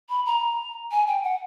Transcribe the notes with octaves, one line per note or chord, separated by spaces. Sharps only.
B5
A#5
G#5
G5
F#5